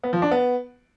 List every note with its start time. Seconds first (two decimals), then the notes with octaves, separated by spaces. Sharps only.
0.03 B3
0.13 F3
0.22 D4
0.31 B3